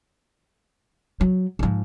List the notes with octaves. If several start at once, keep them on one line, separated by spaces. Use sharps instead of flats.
F#3
G#2 F3